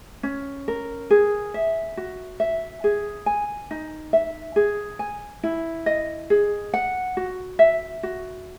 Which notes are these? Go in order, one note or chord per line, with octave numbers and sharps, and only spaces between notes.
C#4
A#4
G#4
E5
F#4
E5
G#4
G#5
D#4
E5
G#4
G#5
E4
D#5
G#4
F#5
F#4
E5
F#4